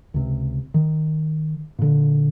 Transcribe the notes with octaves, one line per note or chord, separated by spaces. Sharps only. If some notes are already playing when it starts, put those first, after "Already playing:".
C#2 C3
D#3
A#2 D3